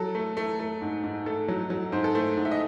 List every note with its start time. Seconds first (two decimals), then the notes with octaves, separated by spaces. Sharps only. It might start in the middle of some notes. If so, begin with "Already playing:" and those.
Already playing: F#3 A4
0.15 A3
0.37 A3
0.60 A3
0.82 G#2
1.04 G#2
1.26 A3 A4
1.48 F#3
1.70 F#3
1.92 G#2 C5
2.04 A4
2.15 A3 C5
2.37 G#2
2.45 E5
2.51 D#5